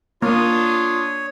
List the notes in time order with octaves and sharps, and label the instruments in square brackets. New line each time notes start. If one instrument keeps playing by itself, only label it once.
[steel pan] A#3 [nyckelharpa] D4 D#6 [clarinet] F4 [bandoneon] C#5